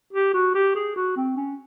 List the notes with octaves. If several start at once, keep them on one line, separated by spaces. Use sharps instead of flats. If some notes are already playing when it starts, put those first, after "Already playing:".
G4
F#4
G4
G#4
F#4
C4
C#4